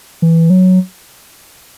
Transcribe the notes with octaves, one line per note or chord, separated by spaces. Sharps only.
E3
F#3